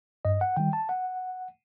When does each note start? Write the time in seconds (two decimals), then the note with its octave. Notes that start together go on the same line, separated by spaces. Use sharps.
0.25 G2 D#5
0.41 F#5
0.56 D#3 G3 G5
0.73 A5
0.89 F#5